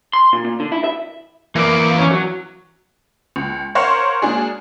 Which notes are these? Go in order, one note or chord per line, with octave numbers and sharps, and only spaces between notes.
C6
A#2
A#2
D3
E4
E5
E3 A#3 D5
C#4
F#3
C#2
A#4 C5 C#5 F5 F#5
G#3 A#3 D4 F#4 G#4